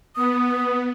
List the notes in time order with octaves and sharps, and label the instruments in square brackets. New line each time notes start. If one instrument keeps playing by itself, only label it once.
[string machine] B3 [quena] D#6